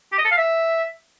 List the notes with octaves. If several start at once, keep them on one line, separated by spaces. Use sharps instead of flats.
G4
D#5
A4
F5
E5